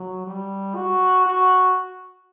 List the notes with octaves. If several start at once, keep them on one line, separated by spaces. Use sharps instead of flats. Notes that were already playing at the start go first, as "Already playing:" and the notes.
Already playing: F#3
G3
F#4
F#4